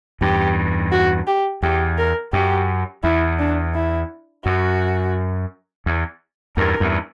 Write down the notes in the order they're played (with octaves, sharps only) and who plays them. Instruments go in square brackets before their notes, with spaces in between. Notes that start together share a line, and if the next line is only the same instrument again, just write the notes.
[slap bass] E2 G2 [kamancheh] G4
[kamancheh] F#4
G4
[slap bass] E2 [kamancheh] G4
[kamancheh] A#4
[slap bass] F#2 [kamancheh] G4
[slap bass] E2 [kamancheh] E4
[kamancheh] D4
E4
[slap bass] F#2 [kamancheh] F#4
[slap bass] E2
[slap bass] E2 G2 [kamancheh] A#4
[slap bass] E2 G2